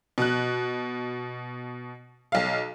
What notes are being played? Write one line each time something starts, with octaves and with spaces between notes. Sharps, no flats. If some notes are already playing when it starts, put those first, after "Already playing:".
B2 F#6
B1 F5